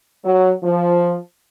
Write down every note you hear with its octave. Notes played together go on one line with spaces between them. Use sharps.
F#3
F3